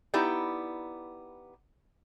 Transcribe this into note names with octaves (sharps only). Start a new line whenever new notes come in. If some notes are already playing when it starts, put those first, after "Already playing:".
B3 D#4 E4 G4 D5